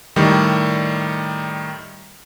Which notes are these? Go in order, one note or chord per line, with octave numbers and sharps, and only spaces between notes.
A2 D#3 G3